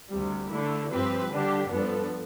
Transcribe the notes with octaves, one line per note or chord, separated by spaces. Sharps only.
D2 C3 G3
D3 A3 E4
G2 F3 C4 G4 B4
D3 G3 D4 G4
G2 F3 B3 D4 A4